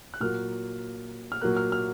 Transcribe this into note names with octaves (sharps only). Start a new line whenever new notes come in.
F#6
A#2 F#3 A#3 F6
F6
A#2 F#3 A#3 F#6
F6
F6